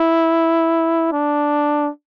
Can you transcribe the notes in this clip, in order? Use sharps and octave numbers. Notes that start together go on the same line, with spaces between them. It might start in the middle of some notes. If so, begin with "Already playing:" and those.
Already playing: E4
D4